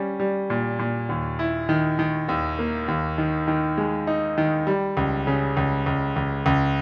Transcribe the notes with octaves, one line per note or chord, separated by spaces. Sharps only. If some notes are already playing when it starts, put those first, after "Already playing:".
Already playing: G3 C#4
G3
A#2
A#2
D#2
E4
D#3
D#3
D#2
A#3
D#2
D#3
D#3
G#3
D#4
D#3
G3
C#2
C#3
C#2
C#2
C#2
C#2